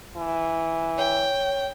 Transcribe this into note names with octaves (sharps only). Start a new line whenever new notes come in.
E3
C#5 G5